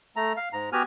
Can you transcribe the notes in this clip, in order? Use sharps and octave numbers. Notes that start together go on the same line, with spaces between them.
A3 A#5
F5
G#2 A#5
B3 F#4 G4 G#5 F6